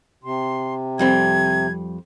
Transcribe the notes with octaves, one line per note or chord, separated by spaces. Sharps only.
C3 C6
F2 G3 C4 G#6